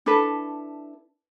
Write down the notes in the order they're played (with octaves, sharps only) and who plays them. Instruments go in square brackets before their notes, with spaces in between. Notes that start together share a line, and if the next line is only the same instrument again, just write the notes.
[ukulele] D4 E4 A4 B4